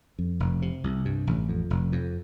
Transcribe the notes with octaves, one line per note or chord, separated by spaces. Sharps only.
F2
F1
C3
C2
G2
A1
F2
F1
F2